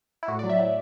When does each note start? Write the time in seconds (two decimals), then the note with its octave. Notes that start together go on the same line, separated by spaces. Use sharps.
0.23 E4
0.28 A2 F#4
0.39 D5
0.44 F#3
0.50 E5
0.59 A2